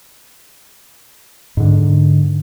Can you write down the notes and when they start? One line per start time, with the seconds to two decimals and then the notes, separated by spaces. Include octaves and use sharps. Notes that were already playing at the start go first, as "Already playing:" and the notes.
1.57 G#2 D3